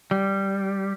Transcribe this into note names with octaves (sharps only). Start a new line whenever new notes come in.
G3